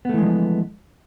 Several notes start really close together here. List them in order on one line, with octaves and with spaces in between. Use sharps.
B3 A3 E3 G#3 F3